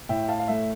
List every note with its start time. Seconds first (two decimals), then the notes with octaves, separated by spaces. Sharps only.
0.09 A2 E5 G5
0.29 F5 A5
0.40 F5
0.48 A3 E5